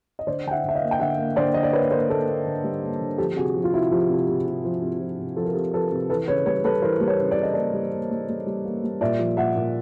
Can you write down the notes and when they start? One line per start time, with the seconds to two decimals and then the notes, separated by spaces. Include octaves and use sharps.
0.19 D#5
0.27 D3 C5 D5
0.46 D3 G5
0.51 E5 F#5
0.64 D3 E5
0.75 D#5 F5
0.81 A#3
0.91 G5
0.99 D3 E5 F#5
1.18 A#3
1.36 D3 C5 D5
1.54 D3 D#5
1.63 D5
1.72 A#3 B4 C#5
1.91 A#3 A#4 C5
2.09 A#3 A4 B4
2.27 A#3
2.46 D3
2.64 G3
2.83 A#3
3.00 D3
3.18 F3 G4 A4
3.36 C3 F#4 G#4
3.55 F3
3.64 F4
3.73 C3 E4 F#4
3.91 F3 F4 G4
4.09 C3
4.28 C3
4.46 C3
4.65 F3
4.82 C3
5.00 F3
5.19 C3
5.36 F3 A4
5.45 A#4
5.54 C3 G4 A4
5.73 F3 A4 B4
5.91 C3
6.10 E3 A4 B4
6.28 C#3 B4 C#5
6.46 G3 B4 C#5
6.64 G3 A4 B4
6.82 E3 A#4 C5
7.00 G3
7.07 B4 C#5
7.20 C#3
7.31 D5
7.37 C#3
7.43 D#5
7.54 A#3 C5 D5
7.74 G3
7.92 A#3
8.11 G3
8.29 G3
8.47 G3
8.65 A#3
8.84 G3
9.01 A#2 D5 E5
9.19 F3
9.37 A#2 E5 F#5
9.56 A#2